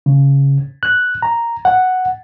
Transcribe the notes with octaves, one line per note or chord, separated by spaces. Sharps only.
C#3
F#6
A#5
F#5